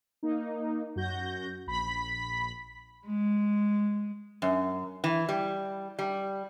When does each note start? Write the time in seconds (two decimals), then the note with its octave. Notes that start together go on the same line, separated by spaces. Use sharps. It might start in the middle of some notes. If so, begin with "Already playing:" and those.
0.23 A#3 D#4
0.96 F#2 F#4 G6 A#6
1.67 A#1 B5 B6
3.06 G#3
4.42 F#2
5.04 E3
5.29 G3
5.99 G3